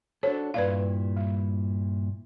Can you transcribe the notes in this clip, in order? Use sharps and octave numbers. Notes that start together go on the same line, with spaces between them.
D4 F#4 A4 C5 C#5
G2 A#2 E4 B4 D5 F5
G3